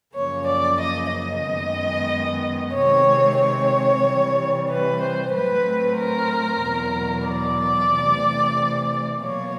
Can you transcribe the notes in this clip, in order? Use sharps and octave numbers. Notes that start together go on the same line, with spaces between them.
F#2 C#3 F3 A#3 C#5
D5
D#5
D#5
F#2 D#3 G#3 B3
C3 D#3 G#3 C4 C#5
C#5
C3 E3 G3
B4
C5
A2 F#3 A3 C4 B4
A#4
E2 B2 F#3
D5
C3 E3 A3
B2 F#3 A#3 C#5